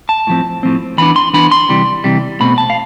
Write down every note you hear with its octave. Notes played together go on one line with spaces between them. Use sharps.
A5
A2 F3 C4
A2 F3 C4
E3 B3 D4 B5
C6
E3 B3 D4 B5
C6
C3 E3 G3
C3 E3 G3
B2 A3 C4 B5
A5
F5